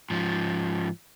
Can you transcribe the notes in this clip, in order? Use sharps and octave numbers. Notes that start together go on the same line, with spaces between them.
G#2 F3